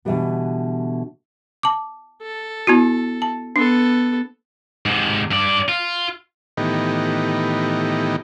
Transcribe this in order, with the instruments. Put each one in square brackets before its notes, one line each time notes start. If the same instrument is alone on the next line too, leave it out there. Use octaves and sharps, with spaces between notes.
[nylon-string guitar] B2 D3 E3 F3 G3 B3
[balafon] A5 D6
[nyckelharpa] A4
[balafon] B3 E4 F#4
A5
[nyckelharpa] B3 A4 [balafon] D4
[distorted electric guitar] G#2 C3
G2 D5
F4
[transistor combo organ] A2 D#3 E3 B3 D#4 G4